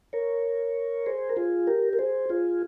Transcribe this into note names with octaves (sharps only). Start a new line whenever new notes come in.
A#4 C#5
G#4 C5
A#4
F4 G#4
G4 A#4
A#4
G#4 C5
F4 G#4